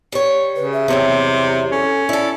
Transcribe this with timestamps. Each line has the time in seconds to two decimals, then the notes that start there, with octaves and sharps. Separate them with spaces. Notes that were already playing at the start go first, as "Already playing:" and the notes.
0.12 G3 C#5
0.56 C#3 B4
0.73 E5
0.88 E2 C3 F#3 G3
1.72 C#4 A4
2.09 E4 A4 D5